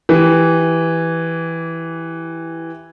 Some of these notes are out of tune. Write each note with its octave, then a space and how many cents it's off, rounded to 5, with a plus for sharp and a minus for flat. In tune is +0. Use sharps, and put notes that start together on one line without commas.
E3 +0 G4 +0